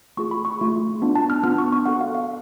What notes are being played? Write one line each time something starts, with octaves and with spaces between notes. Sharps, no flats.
A3 F4 G#4 C#6
B5
C#6
A3 F4 G#4
B3 D4 F4
A5
F6
B3 D4 F4 F6
C#6
C#6
B3 F#4 A4 F#5
F5
F5